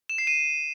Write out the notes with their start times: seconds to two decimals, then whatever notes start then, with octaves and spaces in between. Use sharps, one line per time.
0.10 E7
0.18 C7
0.27 D#7